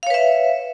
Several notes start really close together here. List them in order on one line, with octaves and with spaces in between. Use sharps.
F5 C#5 B4 E5